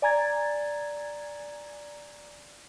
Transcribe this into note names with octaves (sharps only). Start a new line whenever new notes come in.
D5 G#5 A#5 G#6 A6